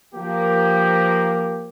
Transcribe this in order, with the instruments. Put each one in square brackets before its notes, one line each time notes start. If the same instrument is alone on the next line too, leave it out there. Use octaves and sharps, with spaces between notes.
[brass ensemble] F3 A#3 [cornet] G4